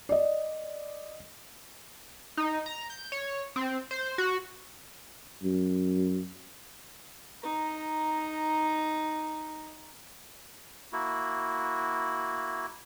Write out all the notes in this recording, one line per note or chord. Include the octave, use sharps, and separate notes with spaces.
D5 D#5
D#4
A#5
G6
C#5
C4
C5
F#4
F#2
D#4 A#5
A#3 E4 F#4